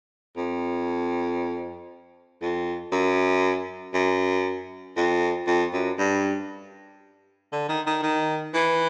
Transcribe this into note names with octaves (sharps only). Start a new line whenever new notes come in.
F2
F2
F#2
F#2
F2
F2
F#2
G2
D3
D#3
D#3
D#3
E3